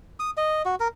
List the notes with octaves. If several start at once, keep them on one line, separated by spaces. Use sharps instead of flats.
D#6
D#5
F#4
A#4